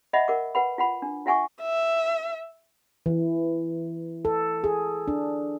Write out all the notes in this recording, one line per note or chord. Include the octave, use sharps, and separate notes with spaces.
D#5 E5 F#5 B5
A#4 F#5 D6
B4 F#5 B5
F4 F#5 B5
D4
F4 E5 F#5 G#5 C#6 D6
E5
E3
A4
G#4
D4